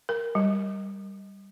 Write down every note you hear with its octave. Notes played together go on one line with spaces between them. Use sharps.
A#4
G3